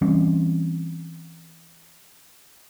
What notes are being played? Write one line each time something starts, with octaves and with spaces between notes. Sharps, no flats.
E3 G3 C4 C#4